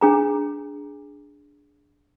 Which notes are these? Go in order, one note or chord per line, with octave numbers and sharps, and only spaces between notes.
D4 G#4 A#5